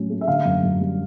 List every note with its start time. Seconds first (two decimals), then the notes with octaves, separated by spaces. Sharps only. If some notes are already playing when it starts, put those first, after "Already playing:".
Already playing: A2 F#3 C#4
0.10 A3
0.21 E5
0.28 D3 F5
0.45 F#2
0.63 F#2
0.81 G3